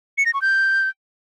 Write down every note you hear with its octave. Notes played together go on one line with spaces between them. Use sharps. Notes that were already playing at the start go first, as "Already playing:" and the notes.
C#7
A#6
C#6
G6